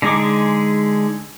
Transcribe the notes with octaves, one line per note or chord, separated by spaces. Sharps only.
D3 G#3 D#4 G#4 D6